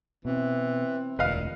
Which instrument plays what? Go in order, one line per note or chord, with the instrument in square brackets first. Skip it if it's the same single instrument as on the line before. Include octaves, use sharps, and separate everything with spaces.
[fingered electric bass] B2 [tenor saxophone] E3 [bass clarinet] C4
[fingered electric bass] E1 D2 [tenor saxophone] A#2 [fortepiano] B4 D#5 F5